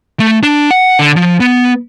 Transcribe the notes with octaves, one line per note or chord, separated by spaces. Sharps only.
A3
D4
F#5
D3
F3
B3